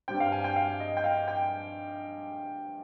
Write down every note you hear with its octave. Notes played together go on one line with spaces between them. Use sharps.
G2 G3 C4 G5
F5
G#5
G5
F5
D#5
G5
F5
G5